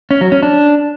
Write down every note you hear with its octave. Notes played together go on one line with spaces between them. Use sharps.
C#4
F#3
C#4
D4